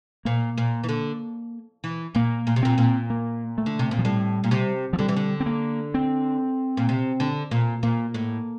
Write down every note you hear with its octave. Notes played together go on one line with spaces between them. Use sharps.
A#2 A#3
A#2
E3
D3
E3
A#2 A#3
A#2
C3
A#2 C4
A#2
A#3
A3
D3
C3
A#2
F3
A2 G3
A#2
C3
F3
D3 G3
E3
D3
C4
A#3
C4
A#2
C3
D3
A#2
A#2 A#3
A2